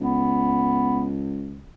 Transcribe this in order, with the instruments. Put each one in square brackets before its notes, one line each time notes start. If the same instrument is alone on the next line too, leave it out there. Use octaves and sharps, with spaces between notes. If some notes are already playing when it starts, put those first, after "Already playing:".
[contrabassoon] C#2 [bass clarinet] B3